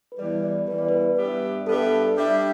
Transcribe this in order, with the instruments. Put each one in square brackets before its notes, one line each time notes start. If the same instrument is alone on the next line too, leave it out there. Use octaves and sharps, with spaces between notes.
[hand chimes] B4
[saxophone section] E2 E3 G3 [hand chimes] D5
[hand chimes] D5
[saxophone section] E2 E3 G3 [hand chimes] B4
[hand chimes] D5
B4
[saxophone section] G2 G3 B3 G4 E5
[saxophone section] G2 G3 B3 G4 E5 [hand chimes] A4
[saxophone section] G3 D4 G4 E5